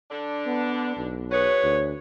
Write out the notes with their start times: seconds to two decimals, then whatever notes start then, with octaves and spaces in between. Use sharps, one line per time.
0.10 D3 D4
0.47 B3
0.96 B1
1.32 F#4 G#4 B4 C#5
1.63 D2